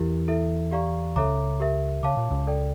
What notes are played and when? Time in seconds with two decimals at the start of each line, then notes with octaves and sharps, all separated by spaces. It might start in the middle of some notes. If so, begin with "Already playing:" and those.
Already playing: E2 E3 E4 G4 A#4
0.28 E4 A4 E5
0.71 G4 D5 F5 A#5 C#6
1.16 C#2 C#3 A4 C#5 E5 A#5 D6
1.60 G4 A#4 E5
2.03 C#3 C#5 F5 A5 D6
2.17 A#2
2.30 C#2 C#3
2.47 A4 D5 G5